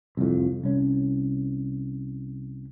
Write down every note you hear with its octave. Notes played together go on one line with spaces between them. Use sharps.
C2 F2
C2 C#4